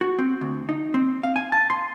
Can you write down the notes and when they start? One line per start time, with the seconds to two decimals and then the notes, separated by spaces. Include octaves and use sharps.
0.01 F#4
0.19 C4
0.41 D2
0.69 D#4
0.94 C4
1.23 F5
1.36 G#5
1.52 A5
1.70 C6